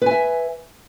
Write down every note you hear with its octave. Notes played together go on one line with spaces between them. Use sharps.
B4 E5 G#5